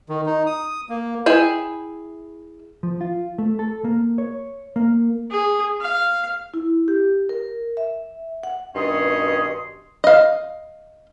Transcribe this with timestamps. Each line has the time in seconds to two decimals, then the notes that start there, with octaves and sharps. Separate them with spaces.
0.09 D#3
0.26 D#4
0.46 D#6
0.89 A#3
1.26 E4 G#4 G5
2.83 F3
3.01 F4
3.38 A3
3.59 A4
3.84 A#3
4.18 C#5
4.76 A#3
5.31 G#4
5.81 F5
6.54 E4
6.88 G4
7.29 A#4
7.77 E5
8.43 F#5
8.76 G2 B2 D#3 C#4 D#5 C6
10.04 D#5 F5